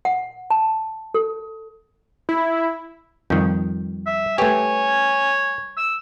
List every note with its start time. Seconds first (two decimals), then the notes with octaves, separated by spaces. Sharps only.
0.05 F#5
0.50 A5
1.14 A4
2.29 E4
3.30 F2 D#3 G3 G6
4.06 E5
4.38 A3 G4 B4 C#5 G#5
5.77 E6